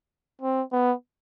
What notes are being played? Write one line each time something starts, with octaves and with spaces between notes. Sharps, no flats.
C4
B3